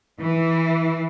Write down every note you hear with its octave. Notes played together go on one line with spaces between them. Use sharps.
E3